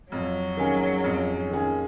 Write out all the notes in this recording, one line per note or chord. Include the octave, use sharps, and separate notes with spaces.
F2 F#3
D#3 A#3 C#4 G#4
F2
D#3 A#3 C#4 G#4